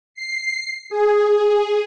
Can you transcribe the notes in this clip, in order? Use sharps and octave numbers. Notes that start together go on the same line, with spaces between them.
C7
G#4